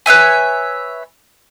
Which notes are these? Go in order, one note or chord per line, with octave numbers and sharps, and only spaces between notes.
B4 C#5 E5 G#5